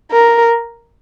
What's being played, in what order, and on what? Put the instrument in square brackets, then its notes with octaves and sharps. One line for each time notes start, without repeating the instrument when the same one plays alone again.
[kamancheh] A#4